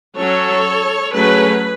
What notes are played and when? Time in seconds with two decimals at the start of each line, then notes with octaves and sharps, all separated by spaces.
0.17 F#3 C#4 A4 C#5
1.13 F#3 A3 C#4 G#4 B4